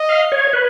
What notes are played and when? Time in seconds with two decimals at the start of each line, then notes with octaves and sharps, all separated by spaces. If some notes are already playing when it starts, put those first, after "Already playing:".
Already playing: D#5
0.09 F5
0.32 C#5
0.53 B4